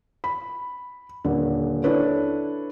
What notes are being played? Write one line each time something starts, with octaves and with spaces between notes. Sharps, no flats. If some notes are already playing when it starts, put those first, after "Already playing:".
B5
D#1 D3
D4 E4 A4 B4 C#5